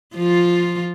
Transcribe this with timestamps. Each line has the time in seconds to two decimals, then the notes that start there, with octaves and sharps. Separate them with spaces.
0.15 F3 F4